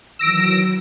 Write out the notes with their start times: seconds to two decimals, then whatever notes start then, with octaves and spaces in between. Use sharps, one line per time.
0.19 D#3 E3 F#3 E6 A#6 D7